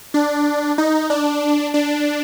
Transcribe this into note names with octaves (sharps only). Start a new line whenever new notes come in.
D4
D#4
D4
D4